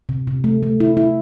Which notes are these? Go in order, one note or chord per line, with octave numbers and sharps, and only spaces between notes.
C3
C3
A3
A3
E4
E4